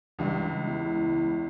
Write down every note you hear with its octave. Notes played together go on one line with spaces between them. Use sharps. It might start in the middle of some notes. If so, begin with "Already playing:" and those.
C#2 G2 E3
E2 E4